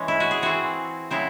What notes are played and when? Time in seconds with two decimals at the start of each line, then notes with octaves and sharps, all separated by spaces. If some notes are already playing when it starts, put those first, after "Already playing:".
Already playing: E3 G#3 C#4
0.08 E4
0.20 F#4
0.31 G#4
0.42 E3 C4 F#4
1.11 C#3 F#3 C4 E4